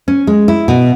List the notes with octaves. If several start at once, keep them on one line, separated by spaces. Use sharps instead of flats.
C#4
G#3
E4
B2